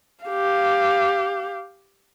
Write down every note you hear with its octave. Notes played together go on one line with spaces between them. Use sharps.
G4 F5